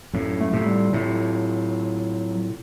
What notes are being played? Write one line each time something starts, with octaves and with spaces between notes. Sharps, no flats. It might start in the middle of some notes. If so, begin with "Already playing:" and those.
F#2 A2
A3
A2 C3
G3
A2 C3 F#3